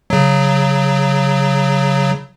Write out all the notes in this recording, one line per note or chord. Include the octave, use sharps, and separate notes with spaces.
C#3 F#3